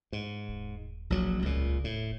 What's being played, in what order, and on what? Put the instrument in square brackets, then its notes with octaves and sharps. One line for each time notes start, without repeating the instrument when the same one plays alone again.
[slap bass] G#2
[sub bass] D#1
[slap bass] A#1 F#3
[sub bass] D#1 [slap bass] C#2 A#2
[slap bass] A2